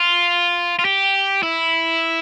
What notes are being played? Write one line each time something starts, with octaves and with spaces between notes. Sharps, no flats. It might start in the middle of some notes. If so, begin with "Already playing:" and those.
Already playing: F4
F4
G4
E4